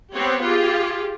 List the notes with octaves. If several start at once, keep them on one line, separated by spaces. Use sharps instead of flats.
B3 C4 G4 C#5
F4 G4 G#4